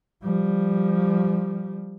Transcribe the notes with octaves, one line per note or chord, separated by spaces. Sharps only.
F3 G3